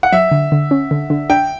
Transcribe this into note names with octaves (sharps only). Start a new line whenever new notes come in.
F#5
F#3 E5
D3
D3
C#4
D3
D3
D4 G5